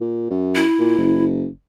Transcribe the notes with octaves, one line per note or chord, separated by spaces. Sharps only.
A#2
F#2
E4
A#2
F#1